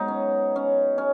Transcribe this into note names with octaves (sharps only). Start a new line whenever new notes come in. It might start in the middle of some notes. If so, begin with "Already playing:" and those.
Already playing: G#2 F#3 B3 D#4
C#4
C#4
C#4